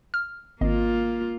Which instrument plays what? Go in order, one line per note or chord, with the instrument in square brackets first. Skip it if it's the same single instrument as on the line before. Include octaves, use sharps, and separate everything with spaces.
[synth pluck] F6
[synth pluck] G#1 D#5 [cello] A#3 F4